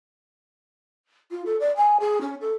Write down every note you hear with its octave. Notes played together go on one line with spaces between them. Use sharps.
F4
A4
D5
G#5
G#4
C#4
A4